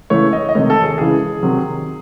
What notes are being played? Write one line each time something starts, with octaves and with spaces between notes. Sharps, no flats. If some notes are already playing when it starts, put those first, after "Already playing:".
C#3 E3 A3 C#5
D#5
D#5
C3 D#3 A3 C#5
A4
G#4
C#3 E3 G#3 G#4
C3 D#3 F#3